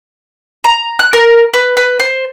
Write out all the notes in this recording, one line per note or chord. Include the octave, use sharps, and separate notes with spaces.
A#5
F#6
A#4
B4
B4
C5